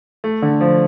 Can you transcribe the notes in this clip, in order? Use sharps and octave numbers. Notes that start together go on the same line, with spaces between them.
A3
D3
F3